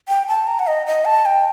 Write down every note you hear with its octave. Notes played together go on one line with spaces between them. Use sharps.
G5
A5
A#5
F#5
D#5
D#5
A5
G5